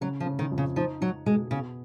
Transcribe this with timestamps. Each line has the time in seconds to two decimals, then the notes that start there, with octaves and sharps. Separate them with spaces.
0.01 C#3 F#3
0.20 F3
0.26 C#3
0.39 D#3
0.52 F2
0.58 C#3
0.76 F3 D#4
1.01 F#3 D#4
1.26 B2 G#3
1.51 C#3 B3